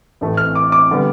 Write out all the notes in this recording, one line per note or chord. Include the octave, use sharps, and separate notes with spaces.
A1 A2 E3 A3
F6
D6
D6
D3 G3 B3